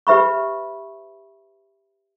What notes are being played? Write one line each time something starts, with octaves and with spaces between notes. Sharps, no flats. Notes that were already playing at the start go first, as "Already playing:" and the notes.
G4 B4 E5 B5 C#6